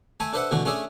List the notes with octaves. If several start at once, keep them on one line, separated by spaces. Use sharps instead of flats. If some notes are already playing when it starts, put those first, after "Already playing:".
A3 A4 E5 G#5
D4 A4 B4 C5 E5 F#5
B2 D3 E3 A3 F#4
A3 C#4 D4 G#4 A4 E5